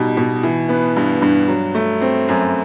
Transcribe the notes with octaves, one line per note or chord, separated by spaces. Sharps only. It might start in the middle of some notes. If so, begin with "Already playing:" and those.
Already playing: B2 G3 D#4
B2
E3
B3
G2
G2
F#3
A3
C4
F#2